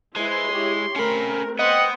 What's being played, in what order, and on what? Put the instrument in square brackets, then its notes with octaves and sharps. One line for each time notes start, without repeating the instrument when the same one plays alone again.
[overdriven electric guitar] G#3 [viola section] E4 B4 C5 [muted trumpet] C6
[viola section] E4 G4 C#5
[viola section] A3 C4 A#4 [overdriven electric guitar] C#4 B5
[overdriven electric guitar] B3 [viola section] B4 C5 G5 [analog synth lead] D#5 [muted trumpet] F#5